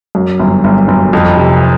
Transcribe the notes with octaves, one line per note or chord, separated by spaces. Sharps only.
F#2
G1
G1
G1
F2
C3